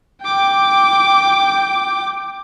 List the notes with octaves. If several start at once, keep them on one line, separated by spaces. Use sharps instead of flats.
G5 D6